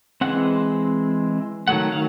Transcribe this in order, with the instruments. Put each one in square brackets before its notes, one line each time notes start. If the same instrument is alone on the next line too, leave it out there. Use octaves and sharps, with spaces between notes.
[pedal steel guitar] E3 G#3 C4 F#5
D#3 F#3 A3 F#5
F5